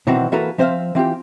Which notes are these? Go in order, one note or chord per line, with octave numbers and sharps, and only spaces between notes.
B2 D#3 E3 F#3 C4 F#4
E3 A#3 F#4 A4 B4 A#5
F3 C4 C5 D5 E5 F5
E3 C4 F4 G4